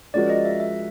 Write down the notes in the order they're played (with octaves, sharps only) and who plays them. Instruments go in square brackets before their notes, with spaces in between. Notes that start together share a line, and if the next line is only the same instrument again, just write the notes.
[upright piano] F3 G#3 C#4 F#4 A#4 [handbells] D5
[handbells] D#5
E5
E5